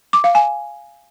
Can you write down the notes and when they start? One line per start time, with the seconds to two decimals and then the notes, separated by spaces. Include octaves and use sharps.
0.13 D6
0.24 F5
0.35 G#5